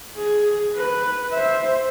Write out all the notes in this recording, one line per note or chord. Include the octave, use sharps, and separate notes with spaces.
G#4
B4
C5 E5